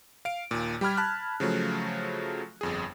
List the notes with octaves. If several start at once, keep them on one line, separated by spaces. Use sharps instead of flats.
F5 D7
D#2 A#2
G3 G4 B5 F6 G#6
A5 B5 F6 F#6
C#3 F3 F#3 A3
G1 F2 G#4